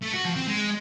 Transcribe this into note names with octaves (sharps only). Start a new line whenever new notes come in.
A3
F#4
F3
C4
G#3